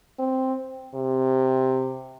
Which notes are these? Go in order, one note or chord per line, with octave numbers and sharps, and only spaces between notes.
C4
C3